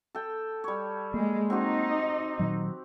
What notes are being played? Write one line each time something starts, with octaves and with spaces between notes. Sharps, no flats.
A4 G5
G3 C#5
G#3 A#3
C4 D#4 F#4 G4
A#2 D#3 F#3